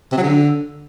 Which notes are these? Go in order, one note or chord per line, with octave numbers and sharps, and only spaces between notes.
C3
F#3
D3